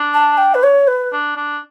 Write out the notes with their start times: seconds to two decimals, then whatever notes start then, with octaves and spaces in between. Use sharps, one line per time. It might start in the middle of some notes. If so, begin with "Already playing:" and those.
Already playing: D4
0.14 A5
0.38 G5
0.54 B4
0.63 C#5
0.87 B4
1.12 D4
1.36 D4